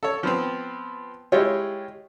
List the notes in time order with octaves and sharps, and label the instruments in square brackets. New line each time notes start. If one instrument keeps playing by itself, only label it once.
[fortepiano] A4 C#5
F3 B3 C4
[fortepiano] G#3 E4 F4 [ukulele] G4 C#5